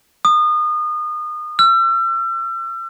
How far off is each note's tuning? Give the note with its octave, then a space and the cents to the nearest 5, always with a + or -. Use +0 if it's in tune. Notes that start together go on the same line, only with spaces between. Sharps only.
D#6 -30
E6 +45